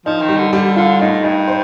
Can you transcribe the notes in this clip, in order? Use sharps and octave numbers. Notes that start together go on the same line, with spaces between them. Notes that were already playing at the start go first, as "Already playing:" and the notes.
F3 D#4
D#3
G3
D3
D3 G3
D3 F4
A2 D#4
G2 D#4
C5